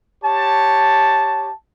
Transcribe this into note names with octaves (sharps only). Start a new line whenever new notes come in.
G4 C#5 A5